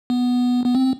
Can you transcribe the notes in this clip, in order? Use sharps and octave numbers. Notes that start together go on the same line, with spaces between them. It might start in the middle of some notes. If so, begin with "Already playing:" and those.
B3
B3
C4